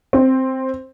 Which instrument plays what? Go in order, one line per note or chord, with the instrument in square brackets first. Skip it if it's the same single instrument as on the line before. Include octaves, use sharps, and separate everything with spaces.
[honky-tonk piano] C4